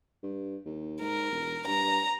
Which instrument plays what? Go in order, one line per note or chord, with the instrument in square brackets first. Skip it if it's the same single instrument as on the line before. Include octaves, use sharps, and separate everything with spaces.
[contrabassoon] G2
D#2
[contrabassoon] G#2 [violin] A#4
[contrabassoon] E1
[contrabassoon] G2 [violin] A#5